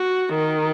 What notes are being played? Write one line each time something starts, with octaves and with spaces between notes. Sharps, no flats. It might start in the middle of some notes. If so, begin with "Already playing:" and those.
Already playing: F#4
D#3